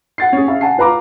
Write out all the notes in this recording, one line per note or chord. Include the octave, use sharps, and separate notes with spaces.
F#5 A6 C7
C#4 G#4
C#4 E5 F5
F#5 G#5 A5 C7
F4 B4 F5 A#5 D6